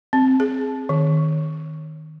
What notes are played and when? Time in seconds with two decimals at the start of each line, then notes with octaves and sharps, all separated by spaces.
0.13 C4
0.40 G#4
0.89 D#3